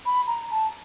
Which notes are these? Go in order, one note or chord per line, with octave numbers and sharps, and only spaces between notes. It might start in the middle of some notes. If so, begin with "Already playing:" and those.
B5
A#5
A5